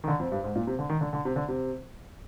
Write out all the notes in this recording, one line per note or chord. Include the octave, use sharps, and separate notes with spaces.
D#3
D3
F2
G2
G#2
A#2
C3
D3
D#3
D3
D3
C3
D3
C3